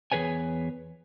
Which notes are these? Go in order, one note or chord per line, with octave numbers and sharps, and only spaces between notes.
E2 G#4 B4 C#5 G#5